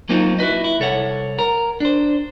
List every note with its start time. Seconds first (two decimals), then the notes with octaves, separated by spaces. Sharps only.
0.09 F#3 A#3 C4 D#4 F4
0.39 E4 F#4 B4 D#5
0.64 E4
0.80 C2 A4 C#5 F#5
1.39 A#4
1.80 D4 C5